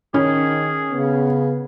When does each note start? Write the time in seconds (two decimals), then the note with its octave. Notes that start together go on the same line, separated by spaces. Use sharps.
0.14 D#3 C#4 G#4
0.92 C#3 B3